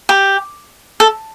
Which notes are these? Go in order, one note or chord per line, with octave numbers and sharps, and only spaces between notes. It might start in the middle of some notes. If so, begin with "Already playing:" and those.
G4
A4